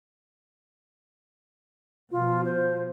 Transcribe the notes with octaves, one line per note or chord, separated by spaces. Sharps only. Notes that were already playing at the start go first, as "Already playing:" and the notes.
B2 F3 F4
C5